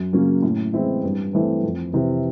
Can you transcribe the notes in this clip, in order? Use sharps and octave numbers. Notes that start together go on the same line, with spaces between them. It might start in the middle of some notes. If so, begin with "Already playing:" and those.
Already playing: F#2
C#3 F#3 A#3 C#4
A2
E3 G#3 C4 E4
G2
E3 A3 C4
F2
C3 E3